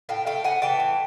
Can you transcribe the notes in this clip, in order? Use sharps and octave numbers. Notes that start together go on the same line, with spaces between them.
A2 F5 G5
A3 F5 G5
A2 F#5 G#5
E3 G5 A5
A2